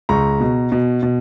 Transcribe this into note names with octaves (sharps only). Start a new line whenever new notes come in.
C#2 A#5 C#6
B2
B2
B2